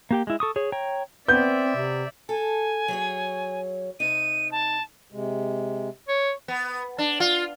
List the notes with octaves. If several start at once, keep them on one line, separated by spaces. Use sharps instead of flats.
A#3 G4 G5
G#3 E4
A4 C#6 D#6
G#4 C#5
C#5 G5 A#5
B3 C4 D5 E5 G6
C3
A4 G#5
F#3 G#4 C#5
C3 D#4 D#7
A5
C3 G#3
C#5
B3
D4
F4